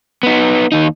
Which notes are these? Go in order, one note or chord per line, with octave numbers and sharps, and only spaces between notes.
B3 D#4
D#2 D#4